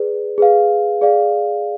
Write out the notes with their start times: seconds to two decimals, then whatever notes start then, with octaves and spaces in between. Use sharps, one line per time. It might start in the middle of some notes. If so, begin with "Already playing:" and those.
Already playing: G#4 B4 D5
0.38 G#4 B4 F5
1.01 G#4 D5 F5